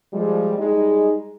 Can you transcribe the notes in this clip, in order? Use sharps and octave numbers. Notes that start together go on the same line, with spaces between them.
F3 G3 G#3
G3 G#3 D#4